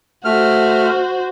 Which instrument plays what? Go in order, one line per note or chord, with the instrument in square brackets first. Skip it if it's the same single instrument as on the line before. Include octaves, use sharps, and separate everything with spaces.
[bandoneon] A3 F6 [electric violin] F#4 C5